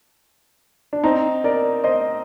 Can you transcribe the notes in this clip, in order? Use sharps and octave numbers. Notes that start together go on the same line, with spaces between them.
D4
C4 D#4
A#4 D5
C5 D#5